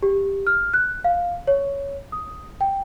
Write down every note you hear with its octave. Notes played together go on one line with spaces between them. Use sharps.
G4
F6
F#6
F5
C#5
D#6
G5